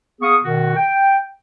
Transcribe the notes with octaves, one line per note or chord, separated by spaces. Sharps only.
B3 G#4 F5 C#6 D#6
B2 D#3 F#4
G5